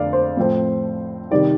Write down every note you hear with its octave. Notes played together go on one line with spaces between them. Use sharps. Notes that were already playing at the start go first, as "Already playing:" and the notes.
Already playing: F2 D3 A3 D5 F5
C5
A2 F3 C4
C3 D#3 G3 D5